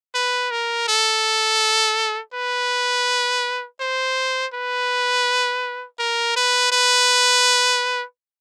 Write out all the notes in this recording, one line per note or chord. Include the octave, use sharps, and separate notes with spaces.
B4
A#4
A4
B4
C5
B4
A#4
B4
B4